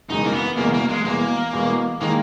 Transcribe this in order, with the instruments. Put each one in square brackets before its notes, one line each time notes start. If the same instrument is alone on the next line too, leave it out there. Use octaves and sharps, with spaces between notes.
[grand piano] F#1 E2 B2 G#3 [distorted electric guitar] D#4
[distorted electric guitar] A#3
B3
[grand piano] F#1 E2 B2 G#3 [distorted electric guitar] A#3
[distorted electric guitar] A#3
G#3
[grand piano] E2 B2 G#3 [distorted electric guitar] A#3
[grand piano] E2 B2 G#3
[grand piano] D#3 G#3 [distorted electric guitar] A#3